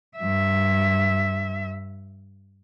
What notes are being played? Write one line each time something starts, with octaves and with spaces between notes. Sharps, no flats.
G2 E5